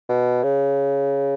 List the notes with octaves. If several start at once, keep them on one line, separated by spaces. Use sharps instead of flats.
B2
C#3